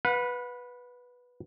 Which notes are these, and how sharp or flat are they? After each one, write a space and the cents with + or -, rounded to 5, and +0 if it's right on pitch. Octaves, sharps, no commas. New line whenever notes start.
B4 -5 F#5 -40